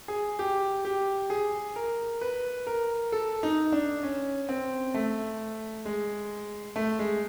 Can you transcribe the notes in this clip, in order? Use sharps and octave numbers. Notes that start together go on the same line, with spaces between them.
G#4
G4
G4
G#4
A#4
B4
A#4
A4
D#4
D4
C#4
C4
A3
G#3
A3
G#3